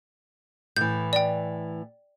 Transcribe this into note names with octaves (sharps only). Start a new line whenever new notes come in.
A2 E3 G6
D5 G5